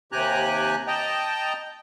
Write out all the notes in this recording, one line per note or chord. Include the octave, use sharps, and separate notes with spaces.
D#2 C3 G4 G#5 A#5 F#6
D#5 G5 A5 A#5